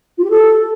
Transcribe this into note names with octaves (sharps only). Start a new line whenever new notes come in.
F4
G4
A4